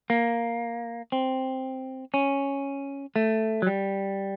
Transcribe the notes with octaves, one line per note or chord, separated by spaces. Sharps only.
A#3
C4
C#4
A3
F#3
G3